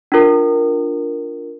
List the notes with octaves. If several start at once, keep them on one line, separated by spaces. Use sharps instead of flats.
D4 F4 A#4